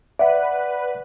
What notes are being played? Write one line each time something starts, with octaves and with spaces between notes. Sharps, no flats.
B4 D5 E5 F#5